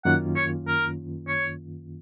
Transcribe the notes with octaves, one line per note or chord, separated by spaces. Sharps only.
F#2 D#3 A#3 C#4 F4 F#5
C#5
A#4
C#5